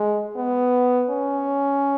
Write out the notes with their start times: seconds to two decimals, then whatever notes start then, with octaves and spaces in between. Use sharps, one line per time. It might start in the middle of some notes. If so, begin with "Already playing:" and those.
Already playing: G#3
0.36 B3
1.10 C#4